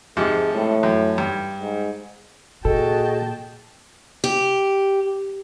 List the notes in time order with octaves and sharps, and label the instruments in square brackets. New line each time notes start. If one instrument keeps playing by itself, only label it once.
[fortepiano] G#2 C3 F3 [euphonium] G#3
[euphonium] A2
[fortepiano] F#2
G2
[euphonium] G#2
[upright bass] A#2 [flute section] F#4 G#4 D#5 [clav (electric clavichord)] A4 [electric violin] G5 A5
[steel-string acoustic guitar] G4